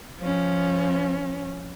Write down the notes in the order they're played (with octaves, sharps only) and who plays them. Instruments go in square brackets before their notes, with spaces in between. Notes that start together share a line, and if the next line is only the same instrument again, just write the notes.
[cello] F3 C#4